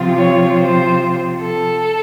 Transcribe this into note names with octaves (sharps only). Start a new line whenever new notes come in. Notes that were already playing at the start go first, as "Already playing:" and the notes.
Already playing: C3 F3 C4 F4
C#5
C5
A4